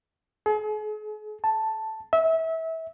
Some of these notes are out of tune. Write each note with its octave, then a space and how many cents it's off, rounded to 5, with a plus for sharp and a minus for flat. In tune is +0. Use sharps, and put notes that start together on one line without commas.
G#4 +40
A5 +0
E5 -25